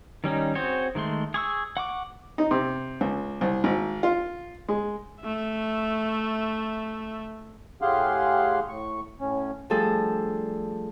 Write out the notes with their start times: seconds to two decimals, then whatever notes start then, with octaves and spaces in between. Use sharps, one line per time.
0.24 D#3 G3 C#4 D#4
0.55 C4 F#4 G#4 C5 C#5
0.95 D#3 G#3 A3 C6
1.34 G#4 C#6 E6
1.77 F#5 C#6 D6
2.38 D#4
2.51 C3
3.01 C#2
3.41 C2
3.64 G#1
4.03 F4
4.68 G#3
5.22 A3 E5
7.82 A2 G4 G#4 F5 F#5 C6
8.69 A2 C#6
9.21 A2 C#4
9.70 F3 G3 A3 D4 G#4 A4